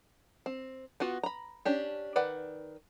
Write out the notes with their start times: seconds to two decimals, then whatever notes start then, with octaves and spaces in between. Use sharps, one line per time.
0.46 C4
1.00 B3 F4 F#4
1.23 A#5 B5
1.65 C#4 D4 G4
2.16 D#3 B4 D5 F#5